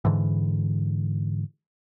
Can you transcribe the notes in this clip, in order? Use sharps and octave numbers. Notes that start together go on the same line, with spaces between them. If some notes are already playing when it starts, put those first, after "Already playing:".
G#2 D3 E3